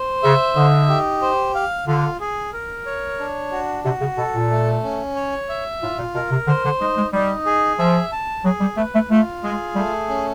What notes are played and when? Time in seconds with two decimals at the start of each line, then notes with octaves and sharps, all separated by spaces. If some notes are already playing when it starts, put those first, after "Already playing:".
Already playing: C5
0.23 C#3 E5
0.55 D3 D#4
0.89 G4
1.22 C5
1.55 F5
1.87 D3 F4
2.20 G#4
2.53 A#4
2.86 C#5
3.19 D4
3.52 F#4
3.84 C3 F#4
4.01 C#3
4.17 B2 A4
4.35 A#2
4.51 A3
4.83 C#4
5.16 C#5
5.49 E5
5.82 A2 F4
5.98 A#2
6.14 B2 A#4
6.31 C3
6.47 D3 C5
6.65 D3
6.81 G#3 D#4
6.96 G#3
7.13 G3 D#4
7.46 G#4
7.79 F3 E5
8.12 A5
8.45 F#3 G#4
8.61 G3
8.77 A3 B4
8.94 A3
9.10 A3 F4
9.43 G#3 G#4
9.76 G3 A3
10.09 C#4